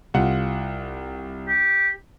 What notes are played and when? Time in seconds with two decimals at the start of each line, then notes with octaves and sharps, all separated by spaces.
0.14 C2 F4 F#5
1.48 G4